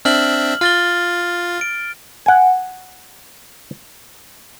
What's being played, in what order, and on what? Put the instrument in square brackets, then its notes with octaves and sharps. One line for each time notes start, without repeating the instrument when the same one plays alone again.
[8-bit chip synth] C4 D4 E5 [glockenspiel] F6 F#7
[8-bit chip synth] F4 [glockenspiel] F6 A6 G7
[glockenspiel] D7
[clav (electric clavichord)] F#5 G#5